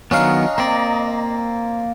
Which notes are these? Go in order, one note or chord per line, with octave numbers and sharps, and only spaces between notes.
D#3 F#3 B3 C#4 D4 D#5 F5 A#5
A#3 C4 D5